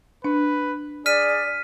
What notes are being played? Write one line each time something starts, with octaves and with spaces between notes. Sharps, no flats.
D4 B4
G#4 D5 F6 B6 D#7